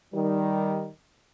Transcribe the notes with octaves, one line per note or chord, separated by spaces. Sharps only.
D#3 G3